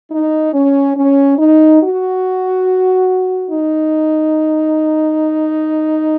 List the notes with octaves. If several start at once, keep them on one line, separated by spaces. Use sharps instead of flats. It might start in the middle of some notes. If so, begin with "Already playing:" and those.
D#4
C#4
C#4
D#4
F#4
D#4